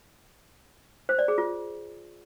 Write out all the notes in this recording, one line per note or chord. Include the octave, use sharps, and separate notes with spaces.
C5
D5
G#4
F4